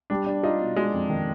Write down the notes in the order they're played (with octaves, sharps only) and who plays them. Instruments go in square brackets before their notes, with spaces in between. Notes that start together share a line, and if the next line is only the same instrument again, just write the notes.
[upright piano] G3 [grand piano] D4
[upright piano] D4
[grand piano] D#4 [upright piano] F4
[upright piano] B2
[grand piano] G#3 [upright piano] D4
[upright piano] F2
D#3